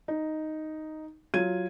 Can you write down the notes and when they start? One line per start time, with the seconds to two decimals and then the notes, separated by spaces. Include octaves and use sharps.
0.08 D#4
1.34 F#3 F4 G#6 D#7